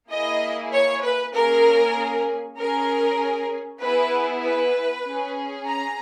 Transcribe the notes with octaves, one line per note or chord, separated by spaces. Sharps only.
A#3 E4 G#4 D#5
C#5
B4
A#3 C#4 G#4 A#4
C#4 G#4 A#4
B3 E4 G#4 B4
B4
C#4 G#4
A#5